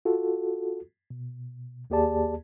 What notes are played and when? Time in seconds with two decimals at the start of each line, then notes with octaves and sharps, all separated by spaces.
0.05 F4 F#4 A4
1.10 B2
1.90 D#2 A#3 G4 G#4 D5 A5